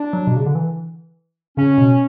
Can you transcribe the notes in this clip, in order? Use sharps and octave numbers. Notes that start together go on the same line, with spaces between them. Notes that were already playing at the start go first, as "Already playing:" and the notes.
Already playing: D4
F#3
B2
C#3
D3
E3
C#3 C#4
B2